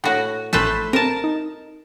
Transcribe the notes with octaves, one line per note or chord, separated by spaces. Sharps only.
A2 F#4 F#5 A#6
A1 F3 A3 B4 C5
C4 A#4 A5
D#4